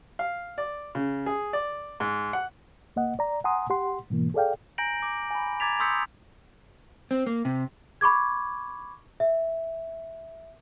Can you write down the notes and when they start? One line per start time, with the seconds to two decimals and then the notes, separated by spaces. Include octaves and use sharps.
0.19 F5
0.58 D5
0.95 C#3
1.26 G#4
1.53 D5
2.00 G#2
2.33 F#5
2.96 C#2 A#3 D#5 F#5
3.19 D5 A#5
3.44 F#5 G#5 A#5 C6 D#6
3.70 G4 F#5 C6
4.10 G#2 B2 E3 A#3
4.34 G#4 A4 D5 F5 G5
4.78 G#5 A#5 G6 A#6 D7 F#7
5.02 D6
5.31 G#5 B5
5.60 A#5 D6 G#6 A6 B6 F7
5.80 C6 D#6 E6 G6 B6 C#7
7.11 C4
7.27 A#3
7.45 C3
8.01 B5 C#6 D6 G#6
9.20 E5